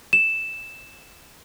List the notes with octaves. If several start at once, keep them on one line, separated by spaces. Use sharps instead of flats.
E7